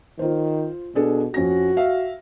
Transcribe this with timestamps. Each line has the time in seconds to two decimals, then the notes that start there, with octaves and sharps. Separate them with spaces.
0.19 D#3 F4 C5
0.95 B2 D4 G#4 A4
1.34 F2 C#4 F#4 A#6
1.77 E5 F5